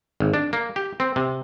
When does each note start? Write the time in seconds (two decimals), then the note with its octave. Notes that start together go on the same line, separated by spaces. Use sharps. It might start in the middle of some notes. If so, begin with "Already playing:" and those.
0.20 G#1
0.34 D4
0.53 A#3
0.76 G4
1.00 C4
1.16 C3